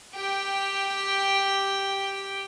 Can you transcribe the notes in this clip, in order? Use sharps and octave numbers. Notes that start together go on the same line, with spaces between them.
G4 G5